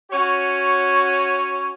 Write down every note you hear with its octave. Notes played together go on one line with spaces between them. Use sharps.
C#4 F#4 C#5